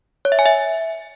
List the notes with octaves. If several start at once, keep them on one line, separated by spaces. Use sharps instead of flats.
C#5
E5
G#5
E5